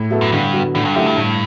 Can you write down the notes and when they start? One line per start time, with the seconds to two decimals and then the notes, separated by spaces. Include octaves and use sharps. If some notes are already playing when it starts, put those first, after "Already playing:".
Already playing: A2
0.10 F#3 B3 E4 A4
0.21 F#2
0.32 G2 D3
0.53 F#3 B3
0.75 A2 D3
0.85 G2
0.95 F#2 A3 E4 G4
1.06 G2
1.17 A2